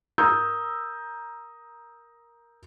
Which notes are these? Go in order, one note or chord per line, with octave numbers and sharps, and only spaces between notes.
A#4 A#5 D#6 E6 G6